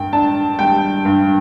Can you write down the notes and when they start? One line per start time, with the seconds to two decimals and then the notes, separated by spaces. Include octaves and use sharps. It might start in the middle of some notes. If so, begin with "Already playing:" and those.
Already playing: G2 G5
0.13 D4 A5
0.59 G3 G5
1.05 G2